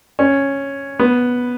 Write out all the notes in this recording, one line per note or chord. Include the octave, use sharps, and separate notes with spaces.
C#4
B3